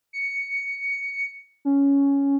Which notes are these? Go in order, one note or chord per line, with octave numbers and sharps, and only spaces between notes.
C#7
C#4